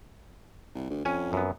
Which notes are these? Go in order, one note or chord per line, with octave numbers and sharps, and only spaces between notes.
C2
D2
F2 C#4 G#5
F#2 B3